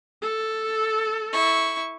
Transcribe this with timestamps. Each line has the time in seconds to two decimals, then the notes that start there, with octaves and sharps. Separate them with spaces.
0.22 A4
1.32 E4 C#6